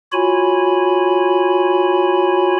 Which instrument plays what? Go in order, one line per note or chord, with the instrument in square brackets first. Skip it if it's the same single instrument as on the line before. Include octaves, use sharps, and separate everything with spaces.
[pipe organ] F4 F#4 C#5 G#5 B5